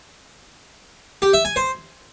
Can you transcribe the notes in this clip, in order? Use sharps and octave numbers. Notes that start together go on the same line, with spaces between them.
G4
E5
G#5
C5